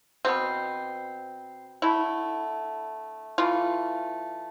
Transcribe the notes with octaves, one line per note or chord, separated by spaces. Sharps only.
B2 B3 C4
D3 A3 E4
E3 A3 F4